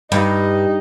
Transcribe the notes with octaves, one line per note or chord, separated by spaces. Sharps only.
G2 D#4